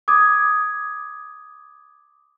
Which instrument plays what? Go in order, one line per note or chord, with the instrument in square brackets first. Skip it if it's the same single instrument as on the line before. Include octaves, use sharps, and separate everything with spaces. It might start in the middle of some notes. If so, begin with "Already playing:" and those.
[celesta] D6 D#6 G#6